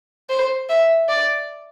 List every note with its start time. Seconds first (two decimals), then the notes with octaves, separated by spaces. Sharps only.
0.29 C5
0.69 E5
1.09 D5